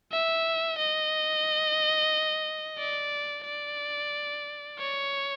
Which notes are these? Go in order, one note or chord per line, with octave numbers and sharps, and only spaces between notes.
E5
D#5
D5
D5
C#5